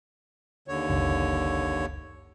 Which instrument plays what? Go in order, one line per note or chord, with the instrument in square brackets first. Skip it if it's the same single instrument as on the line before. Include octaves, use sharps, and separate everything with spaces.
[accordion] D#2 D3 C#5
[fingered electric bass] F#1 C#2